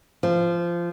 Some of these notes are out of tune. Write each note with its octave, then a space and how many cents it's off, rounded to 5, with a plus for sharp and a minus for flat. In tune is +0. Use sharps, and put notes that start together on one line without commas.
F3 -20